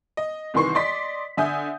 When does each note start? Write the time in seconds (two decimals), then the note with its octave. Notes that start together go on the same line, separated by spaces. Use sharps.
0.17 D#5
0.54 C2 D#3 E3 C6 C#6 C7
0.75 D5 D#5 C6 B6
1.37 D3 E5 G#5 D#6 G6